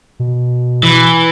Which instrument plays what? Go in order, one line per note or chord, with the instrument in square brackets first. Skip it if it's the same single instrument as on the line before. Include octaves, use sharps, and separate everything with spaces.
[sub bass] B2
[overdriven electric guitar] E3